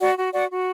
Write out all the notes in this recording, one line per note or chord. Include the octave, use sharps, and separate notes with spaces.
F#4 D5 F#5
F#4
F#4 D5 F#5
F#4